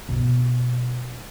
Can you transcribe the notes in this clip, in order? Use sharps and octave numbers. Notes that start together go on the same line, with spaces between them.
B2 E4